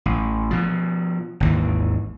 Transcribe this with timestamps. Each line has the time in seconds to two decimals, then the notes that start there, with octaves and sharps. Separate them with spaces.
0.06 A1
0.51 B2 F3
1.40 G#1 D#2 E3